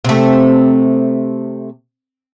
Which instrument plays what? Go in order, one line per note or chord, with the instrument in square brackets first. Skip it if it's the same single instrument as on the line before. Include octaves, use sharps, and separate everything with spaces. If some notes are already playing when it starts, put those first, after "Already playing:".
[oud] C3 A3